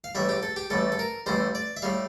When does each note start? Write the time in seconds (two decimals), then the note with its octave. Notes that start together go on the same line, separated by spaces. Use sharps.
0.04 F5
0.15 A1 A2 G3 E5
0.29 G4
0.43 A4
0.56 G4
0.70 A1 A2 G3 A4
0.92 A4
0.99 A#4
1.26 A1 A2 G3 C5
1.55 D5
1.77 E5
1.82 A2 G3 F5